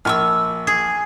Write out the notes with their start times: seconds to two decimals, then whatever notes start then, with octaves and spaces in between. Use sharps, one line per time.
0.05 A#1 G#5 C#6 E6 F6
0.67 G#4